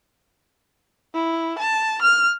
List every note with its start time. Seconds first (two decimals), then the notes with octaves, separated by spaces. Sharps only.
1.14 E4
1.59 A5
2.02 F6